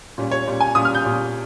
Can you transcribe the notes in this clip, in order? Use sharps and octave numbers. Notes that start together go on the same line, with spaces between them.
A#2 G3 C#4
C#5
A#2 G3 C#4
G#5
A#2 G3 C#4 D#6
F6
G6
A#2 G3 C#4